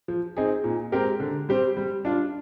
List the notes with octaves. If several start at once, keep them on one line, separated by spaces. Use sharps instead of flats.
F3
C4 D#4 G#4
A#2
G#3 C4 G4 A#4
D3
G3 C4 G4 C5
G3
D4 F4